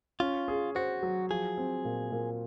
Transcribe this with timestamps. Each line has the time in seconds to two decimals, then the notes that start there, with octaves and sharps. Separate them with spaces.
0.20 C#4 F4
0.48 G#4
0.75 F#4 C5
1.03 F#3
1.30 F3 G#4
1.58 C4
1.85 A#2
2.12 A#2